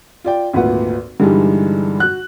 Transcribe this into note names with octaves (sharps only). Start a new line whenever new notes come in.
F4 D5 G5
G#1 D2 A#2 B4 F#5
G2 D3 E3 G3 G#3 D#4
F#4 F#6